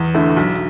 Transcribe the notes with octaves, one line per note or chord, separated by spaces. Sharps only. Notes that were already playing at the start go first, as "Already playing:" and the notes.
Already playing: E2
D3 A3 E4
B1